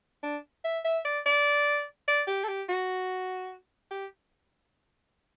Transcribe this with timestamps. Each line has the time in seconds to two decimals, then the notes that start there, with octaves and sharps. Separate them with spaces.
0.23 D4
0.64 E5
0.84 E5
1.05 D5
1.26 D5
2.08 D5
2.27 G4
2.44 A4
2.48 G4
2.69 F#4
3.91 G4